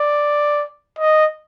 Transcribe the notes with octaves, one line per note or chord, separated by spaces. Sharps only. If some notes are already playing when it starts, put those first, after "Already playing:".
Already playing: D5
D#5